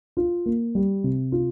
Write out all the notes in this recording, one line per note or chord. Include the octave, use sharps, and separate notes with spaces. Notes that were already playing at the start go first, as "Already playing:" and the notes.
F4
A#3
G3
C3
F4